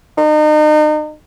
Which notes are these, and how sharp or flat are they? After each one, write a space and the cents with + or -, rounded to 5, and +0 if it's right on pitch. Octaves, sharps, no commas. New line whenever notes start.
D#4 -35